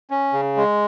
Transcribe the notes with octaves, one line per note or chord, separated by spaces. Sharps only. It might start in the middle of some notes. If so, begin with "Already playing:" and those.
C#4
C#3
G#3